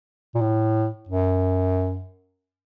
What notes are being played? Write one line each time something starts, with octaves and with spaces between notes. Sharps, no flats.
A#2
A2
F#2